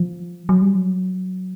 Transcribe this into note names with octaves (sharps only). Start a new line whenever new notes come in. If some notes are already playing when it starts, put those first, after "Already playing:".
Already playing: F3
F#3
G3
F#3